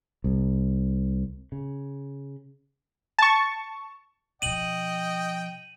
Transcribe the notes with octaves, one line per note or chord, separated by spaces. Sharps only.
C2
C#3
A5 C#6
B2 F3 D#5 G5 D#7 F#7